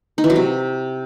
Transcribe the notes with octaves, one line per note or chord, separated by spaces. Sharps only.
D#4
E3
F#3
C3